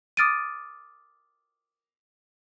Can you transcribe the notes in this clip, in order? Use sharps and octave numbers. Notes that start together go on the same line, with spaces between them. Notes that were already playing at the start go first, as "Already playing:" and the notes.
D6 D#6 F6 A6 D7 D#7